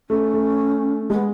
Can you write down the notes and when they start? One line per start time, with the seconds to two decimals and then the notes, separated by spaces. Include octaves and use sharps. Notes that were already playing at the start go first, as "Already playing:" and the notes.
0.09 A3 C#4
0.34 A3
1.10 G#3 B3